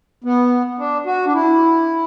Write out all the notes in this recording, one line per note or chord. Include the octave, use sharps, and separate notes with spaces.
B3
D4
F#4
D4
E4